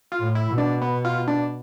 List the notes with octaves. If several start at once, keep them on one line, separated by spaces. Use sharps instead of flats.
F4
A2
E4
B2
D4
B3
F4
D4